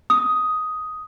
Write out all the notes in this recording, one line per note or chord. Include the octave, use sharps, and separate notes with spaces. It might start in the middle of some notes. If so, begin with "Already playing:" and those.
D#6